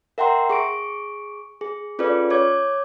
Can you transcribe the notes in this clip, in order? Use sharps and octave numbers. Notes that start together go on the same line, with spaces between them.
A#4 E5 F#5 G5 A#5 C6
G#4 C#6 D7
G#4
C#4 F4 G#4 A4 B4 D5
C#5 D6 G#6